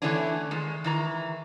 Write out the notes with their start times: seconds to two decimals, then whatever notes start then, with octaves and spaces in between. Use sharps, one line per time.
0.02 D3 E3 A3 B3 C#4 D4
0.51 D#3 G#3
0.84 D#3 E3 A#5